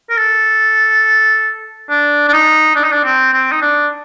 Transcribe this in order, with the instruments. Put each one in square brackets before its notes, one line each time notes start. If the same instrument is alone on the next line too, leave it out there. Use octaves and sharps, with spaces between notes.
[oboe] A#4
A4
D4
D4
D#4
D4
D#4
D4
C4
C4
D#4
D4